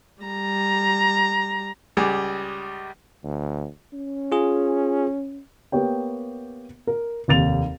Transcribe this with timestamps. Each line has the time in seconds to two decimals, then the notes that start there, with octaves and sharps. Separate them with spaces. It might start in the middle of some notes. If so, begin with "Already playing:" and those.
0.23 G3 A#5
1.97 C#2 G3 G#4
3.24 D2
3.93 C#4
4.32 F4 G#4
5.72 A#3 B3 G4 C#5 G5
6.87 A#4
7.28 F1 D#2 A6 F7